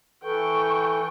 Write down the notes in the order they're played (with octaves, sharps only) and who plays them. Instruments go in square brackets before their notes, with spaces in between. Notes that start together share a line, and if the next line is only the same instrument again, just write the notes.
[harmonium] E3 A4 B4 [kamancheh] G5 C#6